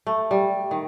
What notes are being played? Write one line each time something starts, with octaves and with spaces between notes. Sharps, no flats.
A3
G3
D#3